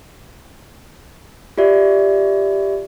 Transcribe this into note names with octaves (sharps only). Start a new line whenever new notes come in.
F4 G4 D5 E5